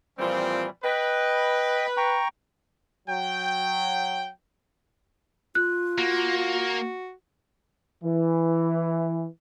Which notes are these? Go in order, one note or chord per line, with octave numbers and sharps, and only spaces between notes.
A#2 E3 F3 G3 C4
B4 D#5 G5
G5 A#5 C#6
F#3 G5
F4 F#6
A#3 F#4
E3